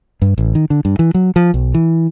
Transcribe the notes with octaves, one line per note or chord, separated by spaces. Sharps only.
G2
A1
D#3
D3
G2
E3
F#3
F3
B1
E3